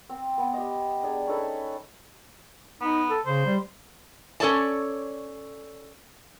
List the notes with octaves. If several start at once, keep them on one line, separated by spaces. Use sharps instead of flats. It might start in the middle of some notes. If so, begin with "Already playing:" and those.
C4
B3
G4 D#5
D4 G#4 A#5
C#4 D#4 A4 B4
B3 D#4
A4
C#3 C5
G3
C#4 A4 C#5 D5 A5